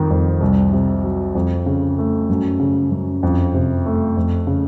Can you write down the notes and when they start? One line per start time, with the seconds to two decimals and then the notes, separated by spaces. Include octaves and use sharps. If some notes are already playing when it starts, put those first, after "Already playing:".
Already playing: F2 D#3
0.11 F2
0.41 C2
0.73 C3
1.03 F#3
1.35 F2
1.66 C#3
1.98 A3
2.29 F#2
2.59 C#3
2.91 F#2
3.23 F2
3.54 C3
3.86 A3
4.17 F2
4.47 C#3